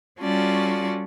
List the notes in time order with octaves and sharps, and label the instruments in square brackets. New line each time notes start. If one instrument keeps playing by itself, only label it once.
[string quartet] G3 C#4 F4 F#4 A4 D5